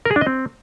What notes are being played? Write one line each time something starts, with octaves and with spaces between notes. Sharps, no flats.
A#4
G#4
D4
D#5
C4